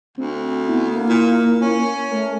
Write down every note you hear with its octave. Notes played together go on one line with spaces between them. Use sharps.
D2 C4
B3 E4
A#3
A#2
C#4
A3 A#4